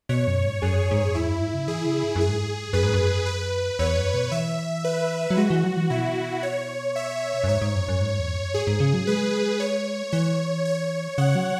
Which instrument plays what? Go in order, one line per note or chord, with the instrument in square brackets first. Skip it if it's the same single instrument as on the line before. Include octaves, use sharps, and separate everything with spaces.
[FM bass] B2 [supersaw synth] C#5
[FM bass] F#2
G#2
[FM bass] F#2 [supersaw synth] G#4
[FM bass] G#2
F#2
[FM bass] E2 [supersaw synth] E4
[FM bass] F#2
G#2
C#3
[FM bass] E3 [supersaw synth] G#4
[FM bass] C#3
G#2
[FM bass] F#2 [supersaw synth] G#4
[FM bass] G#2
[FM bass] F#2 [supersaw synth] B4
[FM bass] G#2
F#2
[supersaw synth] B4
[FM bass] E2 [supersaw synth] C#5
[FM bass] F#2
B2
[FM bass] E3 [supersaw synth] E5
[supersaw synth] B4
[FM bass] F#3
[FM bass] G#3 [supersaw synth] F#4
[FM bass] E3
F#3
E3
[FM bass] B2 [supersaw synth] E4
[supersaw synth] C#5
E5
[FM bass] F#2
[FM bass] G#2 [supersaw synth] C#5
[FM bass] G#2
F#2
F#2
G#2
E2
F#2
[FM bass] G#2 [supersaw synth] G#4
[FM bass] G#2
C#3
F#3
[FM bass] G#3 [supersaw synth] B4
[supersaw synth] C#5
[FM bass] E3 [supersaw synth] C#5
[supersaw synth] C#5
[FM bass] C#3 [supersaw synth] F#5
[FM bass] F#3